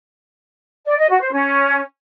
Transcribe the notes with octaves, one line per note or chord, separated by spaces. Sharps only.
D5
D#5
F#4
C5
C#4